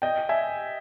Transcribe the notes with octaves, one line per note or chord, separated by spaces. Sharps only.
D#5 G5
E5 G#5